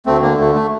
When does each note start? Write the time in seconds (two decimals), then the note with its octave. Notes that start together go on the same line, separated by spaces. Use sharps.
0.06 D2 A3 C4
0.22 D3 A#3
0.39 D2 A3
0.55 A3